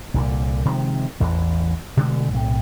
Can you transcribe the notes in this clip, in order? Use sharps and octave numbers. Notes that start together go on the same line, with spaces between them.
C2 A#2 D3
C3 D#3 F3 G#3
A1 E2 E3
B2 D3 G#3 A3
B1 A2 C3